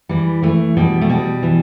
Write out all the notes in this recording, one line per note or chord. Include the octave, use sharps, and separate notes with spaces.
E3 G3
E3 A3
B2 G3
A3
B2 G3
E3